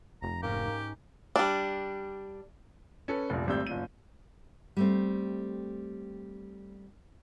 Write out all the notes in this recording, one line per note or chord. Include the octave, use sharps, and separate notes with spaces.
F1 A#5
G#2 A#3 C#4 G4 A#4
G3 D4
C#4 A4 B4
F1 A#1
G#1 G3 A3 C4 E6 G6
F#1 A#2 D#7
G3 A3 C4